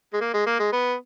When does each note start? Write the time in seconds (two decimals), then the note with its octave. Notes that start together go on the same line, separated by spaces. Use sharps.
0.13 G#3
0.21 A#3
0.34 G#3
0.46 A#3
0.59 G#3
0.72 B3